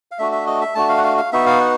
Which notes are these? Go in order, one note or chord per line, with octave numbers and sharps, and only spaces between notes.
F5
A3 D4 F#4 E5
E5
D#5
E5
A3 D4 F#4 A5
F5
F#5
F5
F5
B3 D#4 F#4 E5
F5
F#5